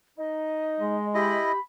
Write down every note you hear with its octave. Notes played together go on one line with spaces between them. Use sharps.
D#4 D#5
G#3
E4 G4 D#5 B5